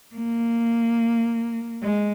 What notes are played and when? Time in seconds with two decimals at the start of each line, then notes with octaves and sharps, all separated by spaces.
0.16 A#3
1.83 G#3